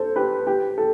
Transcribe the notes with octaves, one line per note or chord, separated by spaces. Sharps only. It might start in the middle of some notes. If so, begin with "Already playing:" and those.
Already playing: A4 C5
G4 B4
G4
A4